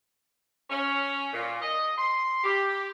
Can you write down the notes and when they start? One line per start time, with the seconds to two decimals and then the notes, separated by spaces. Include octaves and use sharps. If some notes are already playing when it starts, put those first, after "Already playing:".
0.70 C#4
1.33 A#2
1.61 D#5
1.97 C6
2.44 G4